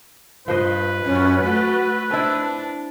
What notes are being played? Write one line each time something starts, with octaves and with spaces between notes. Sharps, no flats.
G2 F3 B4 C5 D#5
F#2 C#4
A3 F#4
C4 D4 E4 A5